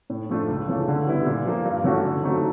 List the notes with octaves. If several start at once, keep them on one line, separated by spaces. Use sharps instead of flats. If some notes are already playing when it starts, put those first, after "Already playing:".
A2
F3 A3 D4 F4
C#2
C#3 E3 A3
D3
G3 B3 E4
A#2
F3 A#3
G2
E3 A3 C#4 F#4
D3
F#3 A3 C4 D#4